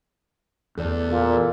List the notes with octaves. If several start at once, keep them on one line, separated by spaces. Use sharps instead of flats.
E2 A4 D5
A#2 A4